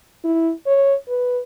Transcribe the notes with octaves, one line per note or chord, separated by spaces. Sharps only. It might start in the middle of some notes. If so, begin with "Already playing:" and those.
E4
C#5
B4